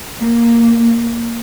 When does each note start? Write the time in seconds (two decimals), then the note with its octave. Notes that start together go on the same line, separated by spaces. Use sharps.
0.21 A#3